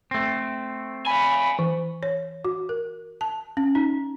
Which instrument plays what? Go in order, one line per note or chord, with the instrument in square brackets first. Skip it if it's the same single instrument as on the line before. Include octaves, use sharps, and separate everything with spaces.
[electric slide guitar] A3 C4
[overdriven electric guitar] F5 G#5 [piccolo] B5
[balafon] E3
C#5
F#4
A#4
A5
C#4
D#4